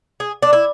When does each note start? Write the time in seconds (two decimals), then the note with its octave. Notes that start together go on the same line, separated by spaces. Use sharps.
0.20 G#4
0.42 D4
0.53 E4